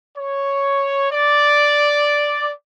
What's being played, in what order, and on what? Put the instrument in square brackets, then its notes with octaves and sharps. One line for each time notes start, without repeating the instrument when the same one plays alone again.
[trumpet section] C#5
D5